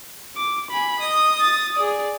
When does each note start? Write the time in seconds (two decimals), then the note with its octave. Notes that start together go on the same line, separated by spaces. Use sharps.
0.37 D6
0.71 G#5 B5
1.00 D#5 D#6
1.41 A6
1.76 G#4 D5